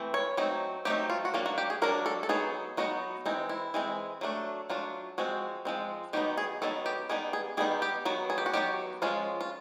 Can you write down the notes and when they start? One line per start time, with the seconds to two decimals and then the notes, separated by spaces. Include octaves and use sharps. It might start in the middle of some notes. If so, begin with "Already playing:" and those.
Already playing: E3 A3 C4
0.14 C#5
0.37 F#3 A3 C4 D#4
0.85 F#3 A3 C4 D#4 G4
1.10 F4
1.25 F#4
1.34 F#3 A#3 D4 F4
1.46 F#4
1.58 G4
1.70 G#4
1.82 F#3 A#3 D4 A#4
2.06 A4
2.23 A4
2.29 F#3 B3 D#4 G#4
2.77 F#3 B3 D#4 F#4
3.26 E3 G#3 C4 D#4
3.49 E4
3.74 E3 G#3 C4
4.21 F#3 A3 D4
4.70 F#3 A3 D4 F4
5.18 F3 G#3 C4 F#4
5.65 F3 G#3 C4
6.13 D#3 F#3 B3 D#4 G4
6.38 G#4
6.62 D#3 F#3 B3 D#4 A4
6.86 G4
7.09 D#3 G3 B3 D#4 G#4
7.33 G#4
7.57 D#3 G3 B3 D#4 G#4
7.82 G4
8.05 D#3 F#3 B3 F#4
8.30 G#4
8.38 G4
8.46 F#4
8.54 D#3 F#3 B3 G4
9.02 F3 G#3 C#4 F4
9.41 F4